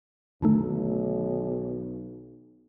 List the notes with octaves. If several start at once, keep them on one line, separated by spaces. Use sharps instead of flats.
B1 D3 D#3 A3